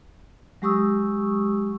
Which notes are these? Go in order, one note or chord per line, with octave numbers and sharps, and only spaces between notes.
F#3 G#3 G4 C#6 D#6 E6